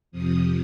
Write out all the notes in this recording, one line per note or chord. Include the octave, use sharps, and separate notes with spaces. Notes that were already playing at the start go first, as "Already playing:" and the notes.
F2 C3 F3 D#6